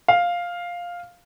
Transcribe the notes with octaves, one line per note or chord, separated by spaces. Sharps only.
F5